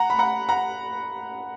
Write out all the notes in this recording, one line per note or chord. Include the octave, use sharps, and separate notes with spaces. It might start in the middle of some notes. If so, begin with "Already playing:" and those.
Already playing: F#5 A#5
B5
F#5 A#5
F#5 A#5